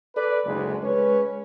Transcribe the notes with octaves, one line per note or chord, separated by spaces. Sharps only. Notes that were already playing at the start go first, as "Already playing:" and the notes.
A4 B4 D5
F#1 D2 G#3
G#3 C#4 B4 C#5